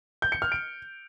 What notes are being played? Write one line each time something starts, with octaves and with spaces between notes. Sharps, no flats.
G6
C#7
F6
D7